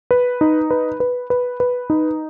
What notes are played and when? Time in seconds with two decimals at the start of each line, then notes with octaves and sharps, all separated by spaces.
0.11 B4
0.41 D#4
0.71 B4
1.00 B4
1.30 B4
1.60 B4
1.90 D#4